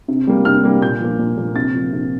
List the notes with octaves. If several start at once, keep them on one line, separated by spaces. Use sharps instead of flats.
C3
G3 A#3
C3 F6
G3 A#3
A#2 G6
F3 A#3
A#2
F3 A#3
C3 A6
F3 A#3
C3